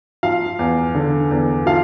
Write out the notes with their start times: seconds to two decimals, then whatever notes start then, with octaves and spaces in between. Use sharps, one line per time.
0.23 F3 F5
0.59 E2
0.95 D3
1.31 E2
1.66 F3 F5